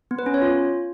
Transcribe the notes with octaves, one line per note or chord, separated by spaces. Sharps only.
B3
B4
C#4
C#5
F4